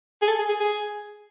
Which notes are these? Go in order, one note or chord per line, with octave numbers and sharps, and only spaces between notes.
G#4
A4
G#4
G#4
G#4